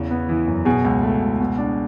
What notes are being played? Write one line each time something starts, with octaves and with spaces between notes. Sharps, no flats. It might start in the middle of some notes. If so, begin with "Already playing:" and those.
Already playing: E2 C#3
B3
E3
F#2
B2 G#4
C#2
A3
C#2
B2
D4